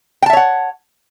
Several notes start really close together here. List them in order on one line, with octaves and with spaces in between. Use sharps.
G5 A5 E5 C#5 F#5